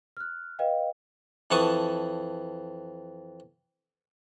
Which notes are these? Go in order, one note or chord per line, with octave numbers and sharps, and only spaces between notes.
F6 F#6
B4 D#5 F5 G5
F2 E3 F#5 A5 C#6 D#6